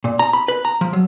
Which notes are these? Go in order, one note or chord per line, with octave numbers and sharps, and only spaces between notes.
A#2
A#5
B5
B4
A#5
F3
F#3